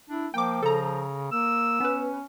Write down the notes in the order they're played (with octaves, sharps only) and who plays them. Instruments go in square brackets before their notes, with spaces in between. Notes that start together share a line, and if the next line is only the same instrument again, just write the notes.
[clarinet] D4 [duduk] E4
[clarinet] F3 [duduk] A#3 [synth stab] G5 D6
[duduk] C#3 [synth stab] A4 A#5
[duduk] A#3 [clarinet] E6
[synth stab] B3 B4 [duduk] C#4